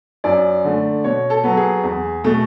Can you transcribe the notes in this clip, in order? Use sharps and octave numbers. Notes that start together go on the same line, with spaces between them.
F#2 D5
D3 A3
B2 C#5
A4
F#3 B3
G#4
E2
B2 A3